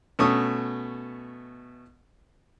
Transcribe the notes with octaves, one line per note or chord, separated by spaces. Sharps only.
B2 A3 C#4 C#6 D#6